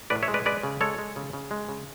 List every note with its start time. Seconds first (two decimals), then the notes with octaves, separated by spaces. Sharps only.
0.10 A2 B4 D5
0.23 C#5 E5
0.28 G#3
0.34 B4 D5
0.45 G#3 B4 D5
0.63 C#3
0.81 G#3 A4 C#5
0.98 G#3
1.16 C#3
1.33 C#3
1.51 G#3
1.68 C#3